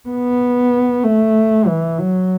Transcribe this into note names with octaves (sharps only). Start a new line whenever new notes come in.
B3
A3
E3
F#3